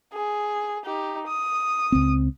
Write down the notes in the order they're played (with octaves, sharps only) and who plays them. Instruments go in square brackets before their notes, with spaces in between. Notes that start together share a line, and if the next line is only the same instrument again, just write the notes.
[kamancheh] G#4
D#4 G4
D#6
[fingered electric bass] C#2 C4